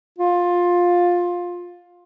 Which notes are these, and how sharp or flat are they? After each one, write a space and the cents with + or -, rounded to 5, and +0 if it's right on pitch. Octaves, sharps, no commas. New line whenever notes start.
F4 +15